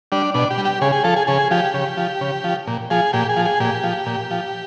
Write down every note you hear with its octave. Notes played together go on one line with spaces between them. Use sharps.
G3 D4
B2 D4
G4
G3
G4
C#3 G#4
G#4
F3 A4
G#4
C#3 G#4
F3 G4
C#3
F3
C#3
F3
A#2
F3 G#4
A#2 G4
G#4
F3
G#4
A#2 G4
F3
A#2
F3